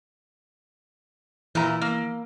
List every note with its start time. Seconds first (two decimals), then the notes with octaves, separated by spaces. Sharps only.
1.55 A#2 E3 E4 A#5
1.81 A#3